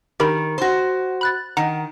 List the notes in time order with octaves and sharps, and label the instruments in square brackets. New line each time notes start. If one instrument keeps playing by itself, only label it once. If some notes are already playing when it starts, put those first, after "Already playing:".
[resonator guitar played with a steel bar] D#3 [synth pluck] G4 A#4 B5
[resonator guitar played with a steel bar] F#4 C5
[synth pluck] B5 F#6 A6
[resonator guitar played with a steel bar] D#3 [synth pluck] F#5 A#5